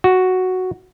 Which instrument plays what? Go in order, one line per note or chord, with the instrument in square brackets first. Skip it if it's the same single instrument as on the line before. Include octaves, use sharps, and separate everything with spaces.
[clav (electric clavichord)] F#4